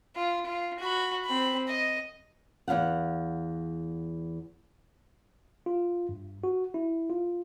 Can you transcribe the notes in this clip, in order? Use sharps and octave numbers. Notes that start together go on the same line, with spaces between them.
F4
F4
F#4 B5
C4 B5
D#5
E2 D#3 F5 F#5
F4
G2
F#4
E4
F4